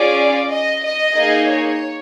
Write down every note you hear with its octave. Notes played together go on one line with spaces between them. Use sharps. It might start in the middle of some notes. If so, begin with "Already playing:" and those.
Already playing: C#4 F4 G#4 D5
D#5
D#5
A#3 D#4 G#4
C#5